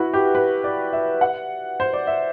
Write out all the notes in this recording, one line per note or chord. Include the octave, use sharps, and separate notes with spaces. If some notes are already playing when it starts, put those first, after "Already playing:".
Already playing: E4 F#4 B4
G4
B4
D5
E5
F#5
C5
D5
E5